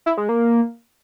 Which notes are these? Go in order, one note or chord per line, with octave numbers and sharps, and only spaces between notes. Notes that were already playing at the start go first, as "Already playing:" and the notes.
E4
G#3
A#3